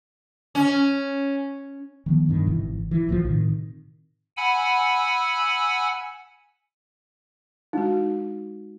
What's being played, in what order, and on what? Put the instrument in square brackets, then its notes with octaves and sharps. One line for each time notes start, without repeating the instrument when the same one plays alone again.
[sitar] C#4
[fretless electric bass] D#3 F3 B3
G2 B2 D#3
G#1 C3 E3
E3
A#1 A#2 E3 F3
A2 C3 D#3
[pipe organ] F#5 G#5 B5 E6
[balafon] G#3 F#4 [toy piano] D#4